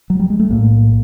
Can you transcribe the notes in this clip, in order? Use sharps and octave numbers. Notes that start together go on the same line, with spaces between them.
F#3
G3
G#3
A3
B1 A2 A#3